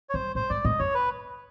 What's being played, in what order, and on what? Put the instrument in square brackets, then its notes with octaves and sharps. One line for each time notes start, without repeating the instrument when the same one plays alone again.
[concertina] C#5
[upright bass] G2 [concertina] C5
[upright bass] A2 [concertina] C5
[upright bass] G#2 [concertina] D5
[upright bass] A2 [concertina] D#5
[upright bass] F#2 [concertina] C#5
[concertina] B4